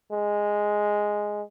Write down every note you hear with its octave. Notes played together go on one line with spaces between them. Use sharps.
G#3